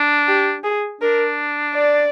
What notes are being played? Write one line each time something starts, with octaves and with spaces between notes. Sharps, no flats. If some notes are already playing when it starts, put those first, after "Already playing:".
Already playing: D4
G4
G#4
D4 A#4
D5